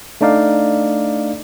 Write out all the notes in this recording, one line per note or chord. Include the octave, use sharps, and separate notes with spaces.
A3 D4 D#4 D5 F5